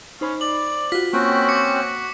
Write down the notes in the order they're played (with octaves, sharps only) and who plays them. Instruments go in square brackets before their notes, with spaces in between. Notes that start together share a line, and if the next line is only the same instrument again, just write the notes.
[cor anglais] C#4 [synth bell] D#4 C5 B5
[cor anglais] D5 [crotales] F#7
[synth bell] F4 F#4 [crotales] B6
[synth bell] A#3 [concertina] C4 C#4 G5 [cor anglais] F#4
[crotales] D6 C#7
[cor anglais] F#4